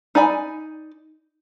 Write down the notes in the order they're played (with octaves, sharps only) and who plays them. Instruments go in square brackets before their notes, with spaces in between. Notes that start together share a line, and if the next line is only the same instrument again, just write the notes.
[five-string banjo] D#4 D5 G#5 B5